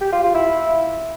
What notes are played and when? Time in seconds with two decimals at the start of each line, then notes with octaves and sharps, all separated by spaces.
0.01 G4
0.12 F4
0.23 F4
0.35 E4